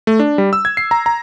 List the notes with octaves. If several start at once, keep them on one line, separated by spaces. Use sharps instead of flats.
A3
D4
G3
E6
G#6
C7
A#5
A#5